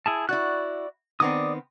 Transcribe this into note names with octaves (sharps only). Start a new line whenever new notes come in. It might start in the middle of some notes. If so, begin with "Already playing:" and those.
E4 G#4 A5
E4 F#4 D5 F#6
D#3 B3 C4 D5 D6 D#6